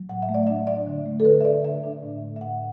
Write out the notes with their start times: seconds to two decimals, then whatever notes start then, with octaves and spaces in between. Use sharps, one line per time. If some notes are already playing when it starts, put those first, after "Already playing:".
Already playing: F#3
0.09 A2 F#5
0.22 E5
0.29 A3
0.34 D5
0.47 D4 E5
0.67 D4 D5
0.87 D3
1.06 A3
1.20 A4
1.25 D3 B4
1.41 E5
1.45 D4 D5
1.64 D3 E5
1.84 D4
2.03 A2
2.22 A3
2.36 E5
2.41 A2 F#5